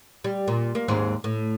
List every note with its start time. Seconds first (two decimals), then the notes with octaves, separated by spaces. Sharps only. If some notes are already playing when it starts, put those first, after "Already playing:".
0.24 G3
0.48 A#2
0.75 A#3
0.88 D#2 G#2 C4
1.24 A2